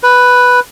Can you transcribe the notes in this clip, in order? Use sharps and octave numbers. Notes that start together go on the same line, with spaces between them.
B4